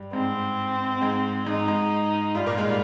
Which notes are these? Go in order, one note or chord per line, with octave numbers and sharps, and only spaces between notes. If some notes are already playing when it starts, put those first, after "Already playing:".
Already playing: G2 G3
G#2 G#3 C4
G#2 G#3
G#2 G#3 D#4
G#2 G#3
G2 G3 F4
A#2 A#3
G#2 G#3
G3